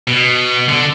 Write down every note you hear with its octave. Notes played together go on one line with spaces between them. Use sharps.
B2
D3